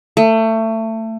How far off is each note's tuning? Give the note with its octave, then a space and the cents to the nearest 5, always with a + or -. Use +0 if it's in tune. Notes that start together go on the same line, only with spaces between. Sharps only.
A3 +25